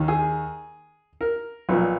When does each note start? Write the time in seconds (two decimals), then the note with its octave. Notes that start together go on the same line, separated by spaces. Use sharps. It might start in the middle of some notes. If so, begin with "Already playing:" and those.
Already playing: D#2 D#3
0.08 G#4
1.21 A#4
1.69 B1 A#2 F3